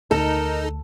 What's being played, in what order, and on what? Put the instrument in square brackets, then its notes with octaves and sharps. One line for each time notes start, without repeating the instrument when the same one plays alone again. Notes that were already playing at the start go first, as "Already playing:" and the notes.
[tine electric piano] D2 [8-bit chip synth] D#4 [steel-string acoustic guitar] A4 [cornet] A#4